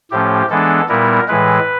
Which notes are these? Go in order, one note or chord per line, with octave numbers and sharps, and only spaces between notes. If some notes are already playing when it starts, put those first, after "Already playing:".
A2 F3 A3 C#4 G4
E3 G#3 B3 D4 A4
A#2 G3 B3 E4 A#4
A2 E3 G#3 B4